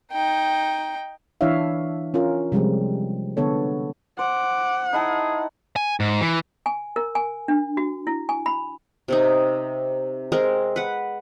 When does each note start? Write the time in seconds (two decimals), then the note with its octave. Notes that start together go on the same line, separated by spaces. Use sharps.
0.12 D#4 G5
1.41 E3 D4 E4 C#5 E5 F5
2.14 C#4 F4 A#4
2.52 C3 F3 G3 G#3 C4
3.37 D3 B3 A4 C#5
4.19 C5 F#5 D6
4.93 D#4 E4 G#4 A5
5.76 G#5
6.00 G#2
6.21 E3
6.66 G#5
6.96 A#4
7.15 G#5
7.48 D4
7.77 F#4
8.07 E4
8.29 G#5
8.46 B5
9.08 C3 C4 D#4
10.32 G#3 C4 A#4
10.76 B4 F#5